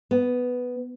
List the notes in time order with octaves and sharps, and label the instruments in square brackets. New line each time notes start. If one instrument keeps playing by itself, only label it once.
[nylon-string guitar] B3